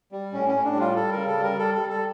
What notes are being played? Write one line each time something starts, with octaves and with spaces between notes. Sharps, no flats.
G3
A2 C#4
C#4
A2
D4
G3
F4
G3 A4
C#3 A#4
A4
G3
A#4
G3 A4
G3 A4
A4